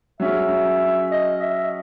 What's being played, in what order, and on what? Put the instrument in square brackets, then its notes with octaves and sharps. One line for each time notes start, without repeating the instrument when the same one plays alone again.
[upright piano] F#3 C#4 G#4 [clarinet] E5
[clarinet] D#5
E5